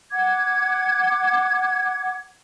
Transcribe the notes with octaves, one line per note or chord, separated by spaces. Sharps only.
F#5 D6 G#6